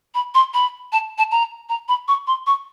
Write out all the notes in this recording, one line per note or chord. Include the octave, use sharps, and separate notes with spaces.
B5
C6
B5
A5
A5
A#5
A#5
B5
C#6
C6
C#6